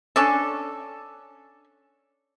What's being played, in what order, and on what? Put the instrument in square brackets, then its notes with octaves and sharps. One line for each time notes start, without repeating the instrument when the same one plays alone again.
[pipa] C#4 D4 A4